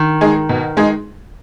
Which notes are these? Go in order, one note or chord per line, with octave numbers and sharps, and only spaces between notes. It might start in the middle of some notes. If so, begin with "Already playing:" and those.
Already playing: D#3
G#3 D#4 G#4
B2
G#3 D#4 G#4